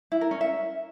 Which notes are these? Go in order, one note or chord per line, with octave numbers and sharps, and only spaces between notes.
E4
A#4
C#4
E5